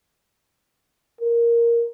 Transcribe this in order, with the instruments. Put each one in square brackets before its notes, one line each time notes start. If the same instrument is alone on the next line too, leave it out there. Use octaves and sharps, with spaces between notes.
[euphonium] A#4